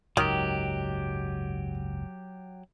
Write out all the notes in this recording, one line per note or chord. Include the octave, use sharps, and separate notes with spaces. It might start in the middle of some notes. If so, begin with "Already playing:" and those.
F#1 C#2 G#2 D#3 F#3 G4